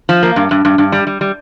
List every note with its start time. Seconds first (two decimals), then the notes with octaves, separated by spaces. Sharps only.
0.09 F3
0.23 A#3
0.36 G2
0.51 G2
0.65 G2
0.78 G2
0.92 G3
1.07 G3
1.21 G3